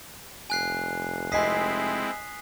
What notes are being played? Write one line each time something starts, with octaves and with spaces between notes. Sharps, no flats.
F1 G#5 F#6 C7
G#3 C4 E4 D#5 G#5 D#6 B6 C7